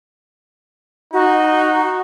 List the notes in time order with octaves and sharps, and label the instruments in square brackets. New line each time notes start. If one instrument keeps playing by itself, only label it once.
[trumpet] D#4 [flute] F#4